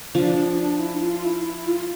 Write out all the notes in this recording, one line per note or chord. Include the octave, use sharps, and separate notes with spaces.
F3 D4
D4
D4
E4
F4
E4
E4
F4